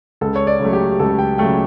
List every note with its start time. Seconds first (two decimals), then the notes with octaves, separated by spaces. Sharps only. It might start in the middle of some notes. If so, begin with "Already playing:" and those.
0.21 C#2 A4
0.36 C#5
0.47 D5
0.60 C#3 F#3 A3
0.73 G4
0.99 C#2 A4
1.19 G5
1.38 C#3 F#3 A3 G5